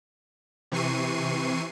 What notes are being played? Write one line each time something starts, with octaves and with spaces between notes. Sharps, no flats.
C3 E3 C#6 C7 D#7